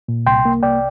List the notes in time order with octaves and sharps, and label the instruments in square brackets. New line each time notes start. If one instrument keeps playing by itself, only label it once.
[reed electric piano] A#2
C2 G5 C6
A#3
C2 D5 G5